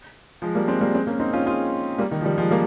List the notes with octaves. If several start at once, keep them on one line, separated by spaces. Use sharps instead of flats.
F3 G#3
G3 A#3
G#3 C4
G3 A#3
G#3 C4
A#3 C#4
C4 D#4
C#4 F4
F4 G#4
G3 A#3
D#3
F3
D#3 G3
F3 G#3
G3 A#3